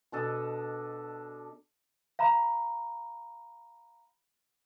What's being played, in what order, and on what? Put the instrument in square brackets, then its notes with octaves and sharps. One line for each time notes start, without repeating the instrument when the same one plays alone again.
[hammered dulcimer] B2 D4 A4 D#5
[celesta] F5 A#5 B5